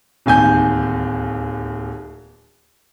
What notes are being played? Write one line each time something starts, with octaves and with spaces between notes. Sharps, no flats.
D1 D#2 G#5 G6